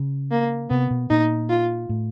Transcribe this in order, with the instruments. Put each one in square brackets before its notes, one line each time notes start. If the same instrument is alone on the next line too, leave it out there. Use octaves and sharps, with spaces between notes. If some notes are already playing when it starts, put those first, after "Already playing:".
Already playing: [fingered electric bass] C#3
[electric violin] A#3
[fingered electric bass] C3 [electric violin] B3
[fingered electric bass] B2
[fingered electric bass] A#2 [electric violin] D#4
[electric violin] F4
[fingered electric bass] A2